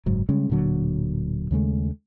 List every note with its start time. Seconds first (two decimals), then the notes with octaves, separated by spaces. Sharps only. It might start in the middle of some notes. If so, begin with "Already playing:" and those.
0.06 F#1 G#2 F#3
0.29 C#3 G3 G#3 C#4
0.50 D1 A#2 D3 F#3
1.51 D#2 C#3 G#3 A3